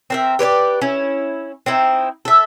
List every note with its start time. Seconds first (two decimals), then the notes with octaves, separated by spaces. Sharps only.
0.10 C4 A#4 E5
0.39 G4 B4 C#5 D5
0.82 C#4 E4
1.66 C4 D#4 E4
2.25 A4 E5